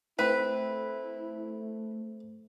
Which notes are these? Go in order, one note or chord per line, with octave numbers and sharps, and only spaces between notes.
A3 C4 E4 B4